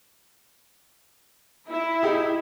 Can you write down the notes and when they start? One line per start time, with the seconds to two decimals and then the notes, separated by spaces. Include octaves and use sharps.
1.69 E4
2.03 D#4 G4 G#4